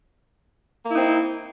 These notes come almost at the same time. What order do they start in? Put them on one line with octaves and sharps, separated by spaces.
A#3 E4 D#4 C4